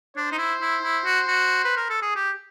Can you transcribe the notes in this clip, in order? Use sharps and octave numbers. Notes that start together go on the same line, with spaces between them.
D4 C5
D#4
E4
E4
E4
F#4
F#4
B4
A#4
A4
G#4
G4